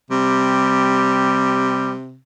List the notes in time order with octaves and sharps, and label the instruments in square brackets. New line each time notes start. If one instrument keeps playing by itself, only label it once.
[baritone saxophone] C3 [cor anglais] G3